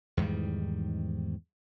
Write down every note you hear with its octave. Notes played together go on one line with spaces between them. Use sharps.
E2 G#2 D#3 G3